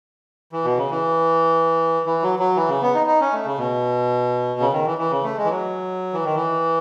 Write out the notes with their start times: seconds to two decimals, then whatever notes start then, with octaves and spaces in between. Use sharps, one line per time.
0.53 E3
0.65 B2
0.77 C#3
0.90 E3
2.06 E3
2.22 F#3
2.39 F#3
2.56 E3
2.69 C#3
2.82 B3
2.95 D#4
3.07 D#4
3.21 C#4
3.33 A3
3.46 C#3
3.58 B2
4.60 C#3
4.73 D#3
4.86 E3
4.98 E3
5.11 C#3
5.23 A3
5.37 G#3
5.45 E3
5.49 F#3
6.13 E3
6.24 D#3
6.35 E3